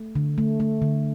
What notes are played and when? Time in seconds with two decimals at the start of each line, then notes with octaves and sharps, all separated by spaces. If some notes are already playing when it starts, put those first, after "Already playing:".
Already playing: A3
0.15 D3
0.38 A3
0.60 A3
0.82 D3